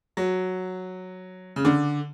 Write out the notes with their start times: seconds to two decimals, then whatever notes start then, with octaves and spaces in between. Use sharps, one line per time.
0.17 F#3
1.56 C#3
1.65 D3